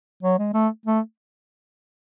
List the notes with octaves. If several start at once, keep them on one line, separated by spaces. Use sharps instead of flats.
F#3
G#3
A3
A3